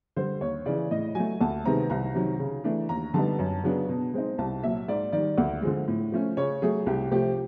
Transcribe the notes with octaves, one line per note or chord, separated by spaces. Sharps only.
D3 G3 C5
D#2 C#5
C#3 E3 D5
A2 D#5
F#3 A3 G#5
D2 A5
C3 D#3 G#3 B3 A#5
C2 A#5
C3 D#3 F#3
C#3
E3 A3 D4
D#2 A#5
D3 G3 B3 D#4 A5
F#2
C#3 F#3 B3 D4
B2
G#3 C4 D#4
C2 A5
A#2 F#3 E5
G#2 D5
D#3 G3 D5
D2
D3 F3 G#3
A2
F3 A3 C#4
C#3 C#5
F#3 A3 G#4
C2 G4
C3 F3 A3 G4